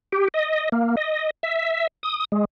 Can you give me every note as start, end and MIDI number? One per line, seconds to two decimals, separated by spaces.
0.12 0.28 67
0.34 0.69 75
0.72 0.95 58
0.97 1.30 75
1.43 1.87 76
2.03 2.25 87
2.32 2.45 56